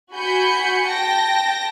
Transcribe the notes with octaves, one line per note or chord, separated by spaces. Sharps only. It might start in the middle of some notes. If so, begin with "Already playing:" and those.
F#4 G#5 B5 G6 C#7
G5 A5 A#6